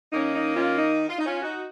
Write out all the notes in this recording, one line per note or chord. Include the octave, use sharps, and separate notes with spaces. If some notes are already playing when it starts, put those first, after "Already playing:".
D#3 A#3 C#4 D#4
D#4
C#4 F4
D#4
F4
D#4
C#4 F4
D#4 F#4